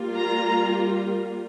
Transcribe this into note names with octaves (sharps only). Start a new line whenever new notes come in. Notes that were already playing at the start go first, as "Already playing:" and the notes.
Already playing: G3 A#3 F4
A#5